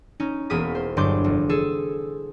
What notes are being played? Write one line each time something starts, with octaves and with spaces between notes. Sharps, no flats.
C#4 D#4
E1 A#3 B3 G#4 D#6 B6
C5
G1 G2 F#3 C6 D6 G6
F1
G#4 A4 E6